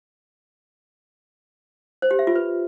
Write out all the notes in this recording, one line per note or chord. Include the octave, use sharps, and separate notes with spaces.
C5
G4
E5
F4
B4